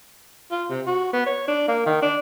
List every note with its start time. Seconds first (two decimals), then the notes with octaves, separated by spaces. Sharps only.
0.51 F4
0.69 C3
0.87 F#4
1.13 B3
1.26 C#5
1.48 D4
1.68 A#3
1.86 D#3
2.02 D4